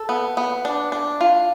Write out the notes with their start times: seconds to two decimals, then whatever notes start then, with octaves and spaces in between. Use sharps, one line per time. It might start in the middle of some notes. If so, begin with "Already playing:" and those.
Already playing: A4
0.09 B3
0.37 B3
0.65 D4
0.92 D4
1.21 F4